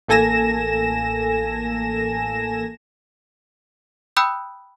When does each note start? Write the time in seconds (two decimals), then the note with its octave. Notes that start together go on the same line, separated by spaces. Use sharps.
0.08 A1 A#3 A4 G#5 A#6 E7
4.17 G5 B5 D#6 E6 F#6 G6